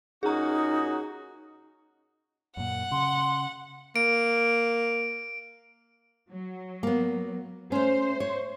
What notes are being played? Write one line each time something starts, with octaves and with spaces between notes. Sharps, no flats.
A#2 C#4 D#4 F#4 G#4 A#5
F#2 A#2 F#5
C#3 C6
A#3 D7
F#3
A#3 B3
A3 C#4 C5
C#5